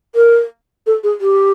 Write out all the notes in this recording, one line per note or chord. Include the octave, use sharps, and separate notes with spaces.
A#4
A4
G#4
G4